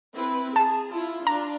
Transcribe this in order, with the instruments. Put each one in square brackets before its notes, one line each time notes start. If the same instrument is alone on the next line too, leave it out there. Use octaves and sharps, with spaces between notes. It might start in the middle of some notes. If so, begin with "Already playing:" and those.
[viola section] C4 E4 B4
[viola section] G#4 [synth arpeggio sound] A5
[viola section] E4 F4
[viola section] D4 F4 [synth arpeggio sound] A#5